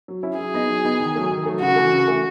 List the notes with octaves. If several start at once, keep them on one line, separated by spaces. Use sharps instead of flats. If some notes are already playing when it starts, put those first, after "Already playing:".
F#3
C#4 E4
F#3 G#4
B3 D#4
F#3
B3 D#4
D#3
F#3 A3
D#3
F#3 A3
C#3 F#4
E3 A3
C#3
E3 A3